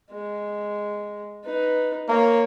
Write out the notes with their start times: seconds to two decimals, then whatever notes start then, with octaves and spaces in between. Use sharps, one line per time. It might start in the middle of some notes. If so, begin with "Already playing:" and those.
0.12 G#3
1.45 D#4 B4
2.09 A#3 C#5